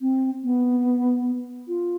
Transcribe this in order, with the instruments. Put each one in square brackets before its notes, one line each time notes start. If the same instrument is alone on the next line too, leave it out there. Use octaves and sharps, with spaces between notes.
[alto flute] C4
B3
F4